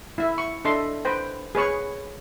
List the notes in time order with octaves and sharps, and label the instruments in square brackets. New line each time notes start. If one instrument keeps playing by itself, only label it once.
[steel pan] E4 E5
C#6
D4 A4 D#5 E5 C6
B4 C5 G5
G#4 B4 C#5 C#6